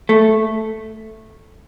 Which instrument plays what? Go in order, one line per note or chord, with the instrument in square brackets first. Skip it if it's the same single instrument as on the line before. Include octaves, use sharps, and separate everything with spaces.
[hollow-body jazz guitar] A3